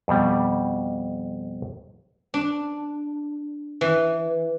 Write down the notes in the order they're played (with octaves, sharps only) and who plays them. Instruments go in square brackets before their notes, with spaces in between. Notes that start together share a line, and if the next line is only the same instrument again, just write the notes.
[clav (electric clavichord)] F2 B2 G3
[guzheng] D4
E3